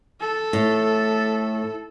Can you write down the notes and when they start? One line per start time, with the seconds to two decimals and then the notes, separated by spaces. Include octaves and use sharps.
0.20 A4
0.53 A2